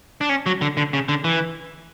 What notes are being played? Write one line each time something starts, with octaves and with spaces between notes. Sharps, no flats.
D4
C#4
F#3
D3
D3
C#3
D3
E3